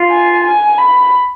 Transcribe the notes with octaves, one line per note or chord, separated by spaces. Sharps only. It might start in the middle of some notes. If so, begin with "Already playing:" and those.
Already playing: F4
G#5
G#5
B5